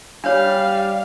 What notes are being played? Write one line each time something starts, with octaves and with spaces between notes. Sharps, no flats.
G3 D4 C#5 F5